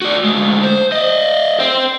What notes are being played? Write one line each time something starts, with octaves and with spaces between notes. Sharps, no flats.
F#4 D5
D2 G#3
C5
D5 D#5
C5 G5